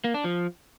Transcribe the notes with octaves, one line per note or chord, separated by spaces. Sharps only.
A#3
D4
F3